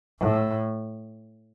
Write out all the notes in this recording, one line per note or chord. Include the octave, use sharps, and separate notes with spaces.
A2